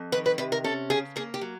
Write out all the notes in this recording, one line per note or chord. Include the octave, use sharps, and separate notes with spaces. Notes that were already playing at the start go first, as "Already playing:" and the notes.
Already playing: F2
D#3 B4
B4
C3 B4
A#4
C#4 A4
C#3 G#4
A#3 G#4
G4
F#3